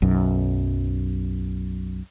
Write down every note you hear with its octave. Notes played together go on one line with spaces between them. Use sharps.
B1 F#2